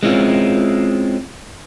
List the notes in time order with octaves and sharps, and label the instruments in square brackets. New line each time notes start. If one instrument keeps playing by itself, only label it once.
[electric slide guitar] G#3 C4 C#4 E4 F4